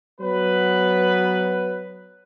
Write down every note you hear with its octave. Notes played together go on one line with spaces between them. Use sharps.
F#3 B3 B4